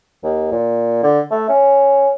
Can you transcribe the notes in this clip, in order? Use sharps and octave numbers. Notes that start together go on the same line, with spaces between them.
D#2
A#2
D3
A3
C#4